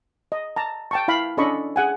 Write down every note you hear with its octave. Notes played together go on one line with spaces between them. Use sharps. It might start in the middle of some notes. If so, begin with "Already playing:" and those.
D#5
A5 A#5
G5 A5 C#6
E4 F5 B5
C#4 D4 A4 D#5 B5 C#6
G#4 F#5 G#5